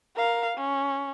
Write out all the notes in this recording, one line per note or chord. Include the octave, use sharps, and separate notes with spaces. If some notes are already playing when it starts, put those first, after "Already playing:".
A#4 F5
C#4